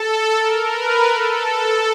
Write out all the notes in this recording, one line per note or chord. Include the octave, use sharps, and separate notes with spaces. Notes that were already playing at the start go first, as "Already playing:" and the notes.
Already playing: A4
A#4
B4
A4